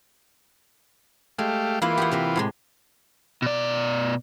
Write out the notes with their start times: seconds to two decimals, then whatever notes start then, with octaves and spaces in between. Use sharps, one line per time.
1.39 G#3 A3 G4 F5
1.82 E3 A#3 E4 F4 F5
1.98 G4 G#4 F#5
2.12 C3 A#4 E5
2.36 A2 C3 G#3
3.42 B2 D5